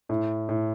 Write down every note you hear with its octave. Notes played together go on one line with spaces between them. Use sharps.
A2
A2